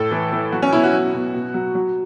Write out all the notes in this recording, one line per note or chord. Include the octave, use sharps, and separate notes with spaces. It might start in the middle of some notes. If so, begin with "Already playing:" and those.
Already playing: A2 A4
E3
E3
F#3 F#4
C#4
B2 E4
F#4
F#3
B2
B2
F#3
F#3